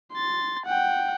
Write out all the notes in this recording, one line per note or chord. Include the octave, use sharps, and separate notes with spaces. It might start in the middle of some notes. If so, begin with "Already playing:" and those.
C6 A6
F#5 G5